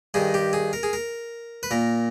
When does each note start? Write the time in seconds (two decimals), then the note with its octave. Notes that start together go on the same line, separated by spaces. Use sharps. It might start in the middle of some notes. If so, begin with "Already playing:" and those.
0.14 G2 D#3 G#4
0.34 G4
0.53 G#4
0.73 A#4
0.83 G#4
0.93 A#4
1.63 B4
1.71 A#2 A#4